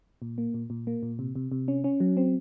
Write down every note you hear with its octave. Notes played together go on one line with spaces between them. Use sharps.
A#2
A#3
A#2
A#2
A#3
A#2
C3
C3
C3
C#4
C#4
F#3
C4